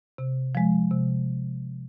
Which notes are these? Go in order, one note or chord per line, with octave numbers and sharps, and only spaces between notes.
C3
F3 G#3
C3